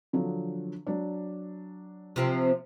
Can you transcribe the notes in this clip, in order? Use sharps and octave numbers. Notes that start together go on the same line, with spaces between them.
D3 F3 F#3
F#3 D4
C3 F3 C4